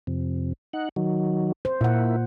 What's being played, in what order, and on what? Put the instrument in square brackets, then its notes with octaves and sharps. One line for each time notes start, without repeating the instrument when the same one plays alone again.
[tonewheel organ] F2 C3
D#4 F#5
D#3 F#3
[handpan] C5
[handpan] A#2 F#5 [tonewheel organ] A#3 E4